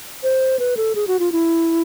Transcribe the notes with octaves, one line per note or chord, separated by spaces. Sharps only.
C5
B4
A4
G#4
F#4
F4
E4